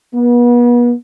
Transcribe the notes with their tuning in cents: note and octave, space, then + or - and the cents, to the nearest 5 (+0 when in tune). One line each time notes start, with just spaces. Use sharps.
B3 -35